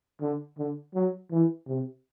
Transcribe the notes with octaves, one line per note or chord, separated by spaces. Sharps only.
D3
D3
F#3
E3
C3